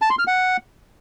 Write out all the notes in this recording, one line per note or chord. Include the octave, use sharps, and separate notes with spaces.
A5
C6
F6
F#5